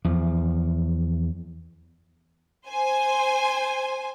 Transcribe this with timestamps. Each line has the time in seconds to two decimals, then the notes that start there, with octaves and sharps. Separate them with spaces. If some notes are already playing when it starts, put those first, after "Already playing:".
0.05 E2 F3
2.67 C5 G#5